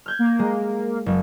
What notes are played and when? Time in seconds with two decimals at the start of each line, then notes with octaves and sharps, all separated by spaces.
0.06 F6 G6 G#6
0.19 A#3
0.39 G#3
1.06 F#1